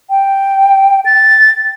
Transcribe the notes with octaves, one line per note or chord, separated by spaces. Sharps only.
G5
A6